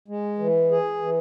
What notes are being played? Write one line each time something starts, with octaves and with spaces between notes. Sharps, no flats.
G#3
E3
G#4
E3